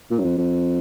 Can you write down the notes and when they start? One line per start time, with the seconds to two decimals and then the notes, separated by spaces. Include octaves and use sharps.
0.11 A#2
0.19 F#2
0.24 F2
0.38 F2